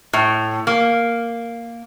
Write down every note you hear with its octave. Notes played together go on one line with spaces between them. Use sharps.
A2
A#3